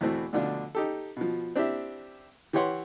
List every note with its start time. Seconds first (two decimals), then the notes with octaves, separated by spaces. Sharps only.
0.01 E2 B2 A3 C4 E4
0.33 D2 B2 D3 F3 D4 F4
0.75 D#4 G4 A4
1.17 B2 F3
1.56 C4 D4 E4 G4 E5
2.53 E3 G4 B4 C#5 F#5 C6